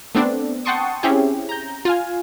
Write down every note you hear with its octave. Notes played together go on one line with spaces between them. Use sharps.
A3 B3 C4 D4
F#5 G5 A5 C6 C#6 D#6
C4 C#4 E4 G4 G#4
A#5 G6
F4 F5 G#5